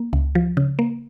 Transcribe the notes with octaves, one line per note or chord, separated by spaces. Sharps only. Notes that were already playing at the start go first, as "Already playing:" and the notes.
Already playing: A#3
C#2
F3
C#3
A#3